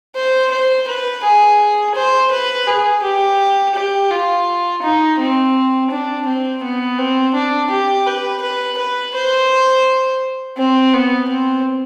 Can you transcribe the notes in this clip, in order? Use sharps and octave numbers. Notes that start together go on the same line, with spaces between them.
C5
C5
B4
G#4
C5
B4
G#4
G4
G4
F4
D#4
C4
D4
C4
B3
C4
D4
G4
B4
B4
B4
C5
C4
B3
C4